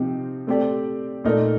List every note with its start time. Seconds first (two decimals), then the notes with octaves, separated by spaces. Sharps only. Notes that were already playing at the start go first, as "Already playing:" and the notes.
Already playing: C3 F3 C4 D#4 G4
0.47 A3 C4 G4 D5
1.24 A#2 A3 D#4 A#4 D5